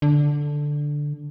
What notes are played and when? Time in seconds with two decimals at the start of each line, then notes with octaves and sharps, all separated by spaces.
0.02 D3